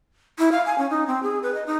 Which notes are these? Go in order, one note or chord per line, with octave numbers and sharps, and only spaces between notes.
E4
F5
G#5
C#4
D#4
C4
G#4
B4
D#5
D#4